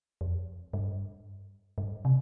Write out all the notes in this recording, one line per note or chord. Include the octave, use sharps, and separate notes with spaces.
F2
G2
G2
C3